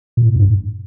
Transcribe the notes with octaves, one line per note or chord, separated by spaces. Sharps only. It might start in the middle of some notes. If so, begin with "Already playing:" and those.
A#2
A2
G2